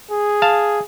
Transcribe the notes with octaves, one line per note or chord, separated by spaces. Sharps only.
G#4
F5 A5